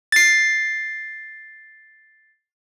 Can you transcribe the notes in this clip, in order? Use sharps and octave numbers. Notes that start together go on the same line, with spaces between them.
A6 C7